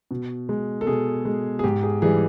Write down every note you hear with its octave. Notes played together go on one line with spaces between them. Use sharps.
B2
G#3
A4
B2 G#4
G#3
G#4
G#2 G4
G#4
E3 G3 G#4